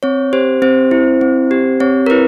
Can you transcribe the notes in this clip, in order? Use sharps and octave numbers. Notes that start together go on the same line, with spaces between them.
C4 C#5
G4 C5
C4 C5
E4
C4
G4
C4 C#5
A#4
E4 B4